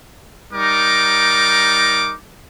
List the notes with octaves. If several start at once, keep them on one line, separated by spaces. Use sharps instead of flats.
G3 D#4 A#4 D6